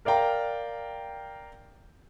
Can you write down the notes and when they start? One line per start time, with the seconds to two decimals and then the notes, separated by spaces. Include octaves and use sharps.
0.05 A#4 D5 F5 G5 A#5